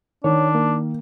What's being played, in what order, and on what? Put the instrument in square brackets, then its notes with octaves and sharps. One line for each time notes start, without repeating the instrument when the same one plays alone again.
[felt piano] D#3 [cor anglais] D4 [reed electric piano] C#5
[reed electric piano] A#3